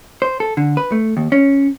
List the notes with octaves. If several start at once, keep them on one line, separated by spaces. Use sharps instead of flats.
C5
A4
D3
B4
A3
D#2
C#4